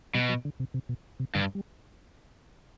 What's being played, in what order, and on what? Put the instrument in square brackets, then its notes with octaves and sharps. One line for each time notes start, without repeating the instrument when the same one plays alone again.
[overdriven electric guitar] B2 [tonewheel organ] G3
[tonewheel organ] F#3
D3
C3
C3
B2
C3
[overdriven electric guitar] G2 [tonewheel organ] D3
[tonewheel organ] G3